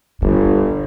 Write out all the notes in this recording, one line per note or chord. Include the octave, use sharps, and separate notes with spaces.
G1 B2